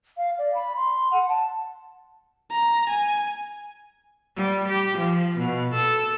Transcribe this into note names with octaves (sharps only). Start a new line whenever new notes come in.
F5
D5
B5
C6
F#5
A5
A#5
G#5
G3
G4
F3
B2
A4